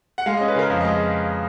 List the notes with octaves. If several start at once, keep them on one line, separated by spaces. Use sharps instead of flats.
F#5
G#3 F5
C#4 D#5
B4
C#3 A#4
F2 F5
G#3 D#5